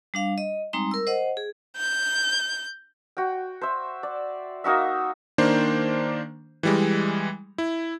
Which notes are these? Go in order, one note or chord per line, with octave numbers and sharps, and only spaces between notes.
G3 D4 F5
D#5
G3 G#3 C4 D#4 A#5 C6
A#4 E6
C5 D#5 F#5
G#4
G6
F#4 G5
C5 E5
D5
A#3 D#4 F#4 E5
D#3 A#3 D4 C5
E3 G3 G#3
E4